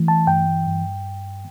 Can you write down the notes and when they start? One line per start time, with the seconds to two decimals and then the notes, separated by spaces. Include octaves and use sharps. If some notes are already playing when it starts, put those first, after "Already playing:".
Already playing: E3 A3
0.08 A5
0.27 G2 G5
0.67 G2